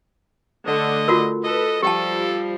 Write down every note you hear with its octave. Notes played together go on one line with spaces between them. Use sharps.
D3 A3 D#5
F4 F#4 A#4
A4 B4 D#5
F3 G3 G4 A4 G5 A5